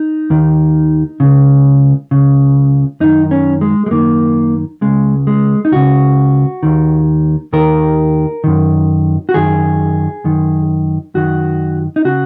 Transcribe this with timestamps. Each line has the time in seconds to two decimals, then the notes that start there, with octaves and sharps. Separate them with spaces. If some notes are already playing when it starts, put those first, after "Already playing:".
Already playing: D#4
0.30 D#2 D#3
1.20 C#2 C#3
2.11 C#2 C#3
3.00 F#2 D#3 D#4
3.31 C#4
3.61 G#3
3.86 G#3
3.91 F#2 D#3 A#3
4.81 C#2 C#3 G#3
5.27 G#3
5.65 D#4
5.72 C#2 C#3 F#4
6.63 D#2 D#3
7.53 D#2 D#3 A#4
8.44 F#2 D#3
9.29 F#4
9.34 F#2 D#3 G#4
10.24 F#2 D#3
11.14 F#2 D#3 F#4
11.96 D#4
12.05 C#3 F#4